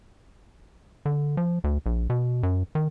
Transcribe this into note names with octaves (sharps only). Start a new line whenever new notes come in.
D3
F3
D2
A#1
B2
F#2
D#3